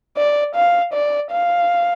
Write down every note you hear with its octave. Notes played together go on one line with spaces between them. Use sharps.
D5
F5
D5
F5